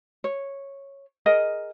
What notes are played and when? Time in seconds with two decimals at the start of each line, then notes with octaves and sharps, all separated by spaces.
0.24 C#5
1.26 G#4 A#4 D#5